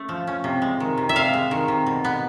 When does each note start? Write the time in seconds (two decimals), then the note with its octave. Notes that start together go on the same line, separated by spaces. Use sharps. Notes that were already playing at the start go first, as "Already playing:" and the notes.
Already playing: A3 C#4
0.09 F3
0.27 C#4
0.44 C3
0.62 G#3
0.80 D#3
0.98 C3
1.09 E5
1.15 C3 F5
1.34 G#3
1.51 D#3
1.68 C3
1.86 B2
2.05 B3